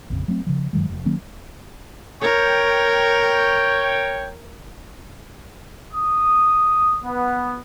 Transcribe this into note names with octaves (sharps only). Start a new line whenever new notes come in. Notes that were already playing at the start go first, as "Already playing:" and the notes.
A#1 F2 C#3
F#3 A3 B3 C4
C#3 F3
G2 D#3 F#3 G#3
F1
D#3 F#3 A#3 C#4
A#4 C#5 G5
D#6
B3